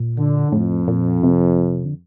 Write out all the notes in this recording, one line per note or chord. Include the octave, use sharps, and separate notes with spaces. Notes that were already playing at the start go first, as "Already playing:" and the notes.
Already playing: A#2
D3
F2 A2
A#2
C3
D3